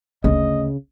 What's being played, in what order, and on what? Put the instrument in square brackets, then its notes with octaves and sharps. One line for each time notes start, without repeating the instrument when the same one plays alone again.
[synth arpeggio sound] G1 [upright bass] D2 A3 [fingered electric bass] C#3 [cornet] D#5